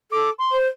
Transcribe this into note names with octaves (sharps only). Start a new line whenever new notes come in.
A4 D6
C6
C5